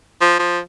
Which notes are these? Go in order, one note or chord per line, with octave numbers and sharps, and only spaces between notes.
F3
F3